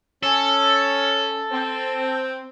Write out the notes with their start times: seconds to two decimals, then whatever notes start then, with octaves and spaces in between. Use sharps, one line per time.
0.23 C#4 A4
1.51 C4